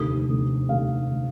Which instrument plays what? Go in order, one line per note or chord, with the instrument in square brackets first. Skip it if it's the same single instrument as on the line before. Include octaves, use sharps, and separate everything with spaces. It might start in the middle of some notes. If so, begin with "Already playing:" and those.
Already playing: [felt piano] F1 D#2 D3 A3 D#6
F1 D#2 D3 A3
F1 D#2 D3 A3 F5
D3 A3